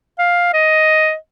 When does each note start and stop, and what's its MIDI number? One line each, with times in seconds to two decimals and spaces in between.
0.19 0.51 77
0.53 1.15 75